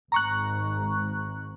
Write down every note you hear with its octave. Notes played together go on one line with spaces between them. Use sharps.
G#1 G#2 A#5 C#6 F#6